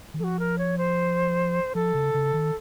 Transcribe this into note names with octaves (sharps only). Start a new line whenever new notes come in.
D#3
F3 F#4 A4
A#4
C#5
C5
F3 A4
C#3
C#3
D#3